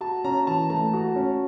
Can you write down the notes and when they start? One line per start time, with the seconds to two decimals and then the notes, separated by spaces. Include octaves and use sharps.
0.01 F#4 A5
0.24 C#4 A#5
0.47 E3 A5
0.70 A3 A5
0.93 F#4
1.16 C#4